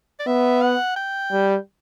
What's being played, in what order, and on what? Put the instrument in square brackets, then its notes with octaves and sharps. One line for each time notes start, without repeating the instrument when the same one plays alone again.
[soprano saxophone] D5
[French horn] B3 [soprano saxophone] E5
[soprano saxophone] F#5
G5
[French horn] G3